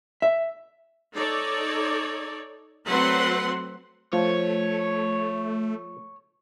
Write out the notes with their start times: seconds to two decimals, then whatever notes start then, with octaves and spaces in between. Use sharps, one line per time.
0.22 E5
1.15 D#4 A4 C#5 D5
2.86 F#3 A3 C4 B4 F#5 C6
4.13 F3 A3 C#5